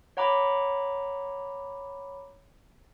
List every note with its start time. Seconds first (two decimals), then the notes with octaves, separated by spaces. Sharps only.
0.17 C#5 F#5 A#5 B5 D6